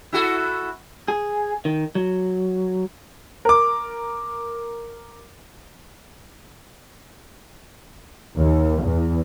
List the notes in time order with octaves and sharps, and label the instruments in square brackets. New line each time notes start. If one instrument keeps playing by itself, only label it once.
[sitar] E4 F#4 A4
[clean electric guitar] G#4
D#3
F#3
[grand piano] A#4 D6
[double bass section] D#2
E2